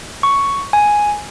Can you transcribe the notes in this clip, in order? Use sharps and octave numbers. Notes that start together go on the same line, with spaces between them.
C#6
G#5